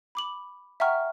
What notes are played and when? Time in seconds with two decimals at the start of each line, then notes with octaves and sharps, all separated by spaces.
0.15 B5 D6 F#7
0.80 E5 F#5 G5 A#5 C#6 F6